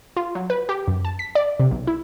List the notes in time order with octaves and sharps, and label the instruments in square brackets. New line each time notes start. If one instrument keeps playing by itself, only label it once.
[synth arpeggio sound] F4
F#3
B4
G4
F#2
A5
B6
D5
C3
B1
E4